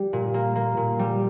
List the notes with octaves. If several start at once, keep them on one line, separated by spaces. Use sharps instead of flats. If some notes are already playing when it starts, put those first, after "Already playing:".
Already playing: G3
A#2
A#3
A#3
A#2
G3